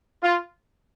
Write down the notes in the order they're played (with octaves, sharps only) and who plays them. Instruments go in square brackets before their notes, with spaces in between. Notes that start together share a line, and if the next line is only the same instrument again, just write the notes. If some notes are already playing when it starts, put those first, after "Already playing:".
[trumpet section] F4